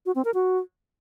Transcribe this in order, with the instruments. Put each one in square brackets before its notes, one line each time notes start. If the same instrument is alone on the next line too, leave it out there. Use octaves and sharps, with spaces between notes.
[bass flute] F#4
C4
A#4
F#4